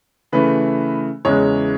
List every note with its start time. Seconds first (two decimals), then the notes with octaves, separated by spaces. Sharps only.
0.32 C#3 E3 A3 B4
1.25 E2 C#3 E3 G#3 C#5